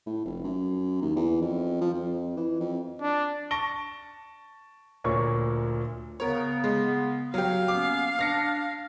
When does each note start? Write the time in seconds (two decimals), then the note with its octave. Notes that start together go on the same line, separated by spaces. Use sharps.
0.07 A2
0.25 F1
0.44 F#2
1.02 D#2
1.16 E2
1.42 F2
1.81 F3
1.94 F2
2.37 E3
2.60 F2
3.01 D4
3.51 A5 C#6 A#6 D7 G7
5.04 D2 A#2 A#3 C#5 C#6
6.20 C#3 B3 A#4 C#5
6.64 G#3
7.34 F#3 G4 F5
7.68 A#3 B3 C#4 D6
8.19 D4 F6 A#6 C#7